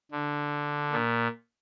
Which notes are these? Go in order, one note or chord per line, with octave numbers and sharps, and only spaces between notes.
D3
A#2